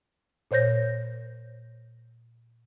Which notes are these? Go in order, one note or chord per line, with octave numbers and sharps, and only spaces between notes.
A#2 C5 C#5 G6 A#6